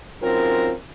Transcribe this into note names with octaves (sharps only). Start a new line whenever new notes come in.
F#3 C4 C#4 D#4 F4 A#4